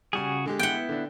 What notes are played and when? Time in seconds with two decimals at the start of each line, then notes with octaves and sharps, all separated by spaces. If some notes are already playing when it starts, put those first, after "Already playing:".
0.13 C#3 G3 F#4 G#4 G#5
0.46 D3 G#3 G4
0.59 B3 E4 F#5 G5
0.89 D3 D4